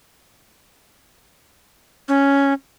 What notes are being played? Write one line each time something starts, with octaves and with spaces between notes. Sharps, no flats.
C#4